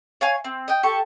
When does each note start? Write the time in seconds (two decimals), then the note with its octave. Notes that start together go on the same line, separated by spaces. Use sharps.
0.21 C#5 F5 G#5
0.44 C4
0.68 D#5 G5
0.83 G4 A4 C#6